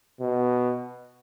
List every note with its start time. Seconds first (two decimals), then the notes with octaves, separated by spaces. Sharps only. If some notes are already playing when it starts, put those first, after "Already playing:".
0.21 B2